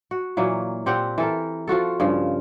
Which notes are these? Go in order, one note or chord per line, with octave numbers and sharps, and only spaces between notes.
F#4
A#2 E3 F#3 A#3
A#2 C4 G4 F#5
E3 A4 A#4
F3 F4 F#4 A4
G2 C#3 F3